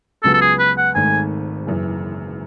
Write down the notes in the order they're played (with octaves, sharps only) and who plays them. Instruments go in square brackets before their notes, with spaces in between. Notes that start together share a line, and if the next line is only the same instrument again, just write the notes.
[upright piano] C#2 C#3 F#3 B3 [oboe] A4
[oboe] A4
G#4
B4
F#5
[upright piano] G#1 G#2 D#3 A3 [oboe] G#5
[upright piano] F#1 F#2 E3